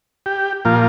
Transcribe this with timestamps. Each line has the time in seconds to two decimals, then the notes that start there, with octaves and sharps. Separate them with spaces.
0.26 G4
0.65 A#2 F3 A#3 F4